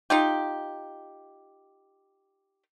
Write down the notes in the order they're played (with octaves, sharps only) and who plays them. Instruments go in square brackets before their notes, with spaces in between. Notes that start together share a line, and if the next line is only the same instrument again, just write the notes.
[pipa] D#4 F4 G4